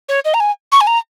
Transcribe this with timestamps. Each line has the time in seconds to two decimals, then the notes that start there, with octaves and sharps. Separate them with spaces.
0.09 C#5
0.25 D#5
0.34 A#5
0.40 G#5
0.72 C#6
0.81 G#5
0.87 A#5